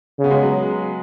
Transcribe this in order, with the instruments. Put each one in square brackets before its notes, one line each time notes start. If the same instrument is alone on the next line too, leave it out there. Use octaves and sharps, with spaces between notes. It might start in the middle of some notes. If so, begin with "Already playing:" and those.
[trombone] C#3
[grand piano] B3
G#3
F#3